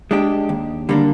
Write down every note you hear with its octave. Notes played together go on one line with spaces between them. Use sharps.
G#3 D4 G4
D#2
D3 G3 A#3 D4